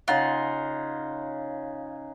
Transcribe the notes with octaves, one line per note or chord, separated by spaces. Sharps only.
C#3 D#4 F4 F#5